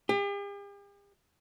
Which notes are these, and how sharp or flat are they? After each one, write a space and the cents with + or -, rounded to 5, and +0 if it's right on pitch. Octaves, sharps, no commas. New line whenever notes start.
G4 +45